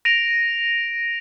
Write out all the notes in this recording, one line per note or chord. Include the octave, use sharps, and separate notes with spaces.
A#6 D7 D#7 F7